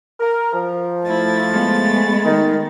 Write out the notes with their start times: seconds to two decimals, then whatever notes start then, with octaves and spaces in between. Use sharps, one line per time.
0.20 A#4
0.53 F3
1.08 A3 E4 A6
1.51 G#3 B3
2.25 D#3